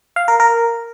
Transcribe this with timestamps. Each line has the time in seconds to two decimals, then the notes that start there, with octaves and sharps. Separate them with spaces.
0.16 F5
0.28 A#4
0.40 A#4